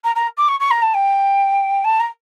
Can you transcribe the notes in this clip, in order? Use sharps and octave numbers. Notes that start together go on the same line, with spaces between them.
A#5
A#5
D6
C#6
C#6
A#5
A5
G5
A5
A#5